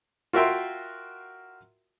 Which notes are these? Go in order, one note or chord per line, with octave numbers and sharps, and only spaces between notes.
F4 F#4 A#4 E5 G5 C6